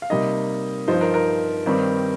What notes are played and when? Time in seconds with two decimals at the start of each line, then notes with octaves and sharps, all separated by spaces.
0.02 F5
0.10 C3 G3 A#3 D#4 D#5
0.87 G2 F3 D#4 C5
1.01 A#4
1.14 A#4
1.66 G2 D#3 G3 C4 D#4